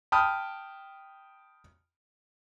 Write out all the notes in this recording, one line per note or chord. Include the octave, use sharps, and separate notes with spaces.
G5 A5 B5 D#6 F6